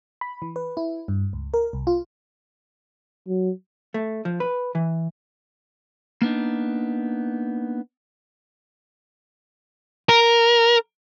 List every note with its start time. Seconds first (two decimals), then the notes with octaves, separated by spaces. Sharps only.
0.21 B5
0.42 E3
0.56 B4
0.77 E4
1.08 G2
1.33 C#2
1.54 A#4
1.73 C2
1.87 F4
3.28 F#3
3.94 A3
4.25 F3
4.40 B4
4.75 E3
6.22 A#3 B3 D4 D#4
10.09 A#4